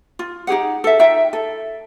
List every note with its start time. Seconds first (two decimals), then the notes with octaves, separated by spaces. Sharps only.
0.19 F4
0.47 D#4 G4 G#4 F#5
0.84 A4 E5
0.99 D#4 F4 E5 G5
1.33 A4